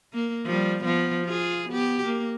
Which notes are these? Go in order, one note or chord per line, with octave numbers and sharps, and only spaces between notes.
A#3
F3 G3
F3 B3
F4 G#4
B3 G4
A#3